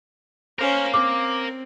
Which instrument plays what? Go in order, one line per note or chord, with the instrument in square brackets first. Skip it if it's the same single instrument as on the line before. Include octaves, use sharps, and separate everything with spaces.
[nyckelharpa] C#4 C5 [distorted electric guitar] A#4 F5
[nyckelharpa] C4 [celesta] D6